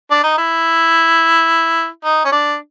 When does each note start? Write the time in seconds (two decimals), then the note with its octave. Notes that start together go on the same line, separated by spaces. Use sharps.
0.11 D4
0.24 D#4
0.38 E4
2.04 D#4
2.25 C#4
2.32 D4